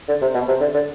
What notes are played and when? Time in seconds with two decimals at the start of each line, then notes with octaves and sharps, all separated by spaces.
0.08 D3
0.21 C3
0.35 B2
0.48 C3
0.61 D3
0.74 D3